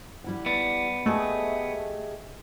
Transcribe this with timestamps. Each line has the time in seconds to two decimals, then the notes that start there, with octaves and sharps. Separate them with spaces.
0.24 G3 E4 F#5
0.46 B3 D5
1.06 A3 G4 G#4 D#5